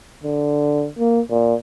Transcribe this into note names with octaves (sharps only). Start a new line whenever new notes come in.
D3
A#3
A#2